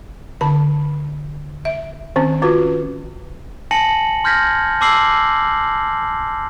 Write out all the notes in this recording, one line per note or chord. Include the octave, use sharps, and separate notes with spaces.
D3 A5
E5
D#3 C4 C#4
C#4 F4 F#4 B4
G#5 A5 A#6 C#7 F#7
C6 F6 G6 G#6 A#6 B6
A5 C6 D6 E6 C7 F#7